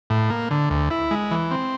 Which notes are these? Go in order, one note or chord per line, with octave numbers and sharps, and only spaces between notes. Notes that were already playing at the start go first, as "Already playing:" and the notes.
A2
A#3
D3
D2
E4
G#3
E3
C4